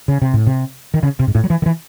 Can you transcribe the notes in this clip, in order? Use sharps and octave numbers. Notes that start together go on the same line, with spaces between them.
C#3
C3
A2
C3
D#3
C#3
C3
G#2
A2
F#3
E3
D#3
E3